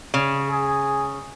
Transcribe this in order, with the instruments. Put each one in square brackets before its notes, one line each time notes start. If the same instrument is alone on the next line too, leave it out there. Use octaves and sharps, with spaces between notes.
[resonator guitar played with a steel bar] C#3
[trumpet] G#4